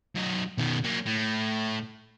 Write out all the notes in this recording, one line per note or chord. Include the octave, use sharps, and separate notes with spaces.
F#2 D#4
B2 D#3
F#3 A#3
A2